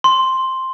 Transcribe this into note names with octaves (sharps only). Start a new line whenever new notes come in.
C6